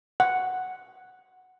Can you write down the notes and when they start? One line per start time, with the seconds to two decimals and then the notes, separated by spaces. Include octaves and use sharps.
0.20 F#5